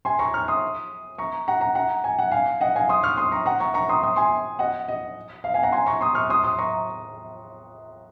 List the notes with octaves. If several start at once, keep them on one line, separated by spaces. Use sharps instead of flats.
G#5 C6
A#5 C#6
C#6 F6
C6 D#6
A#5 C#6
F#5 A#5
F#5 A#5
F#5 A#5
G#5
F#5
F5 G#5
D#5 F#5
F5 G#5
C6 D#6
C#6 F6
C6 D#6
A#5 C#6
F#5 A#5
A#5 C#6
A#5 C#6
C6 D#6
C6 D#6
G#5 C6
D#5 F#5
D#5
F5
F5 G#5
F#5 A#5
G#5 C6
A#5 C#6
C6 D#6
C#6 F6
C6 D#6
C6 D#6
A#5 C#6